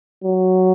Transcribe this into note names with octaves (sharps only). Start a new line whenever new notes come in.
F#3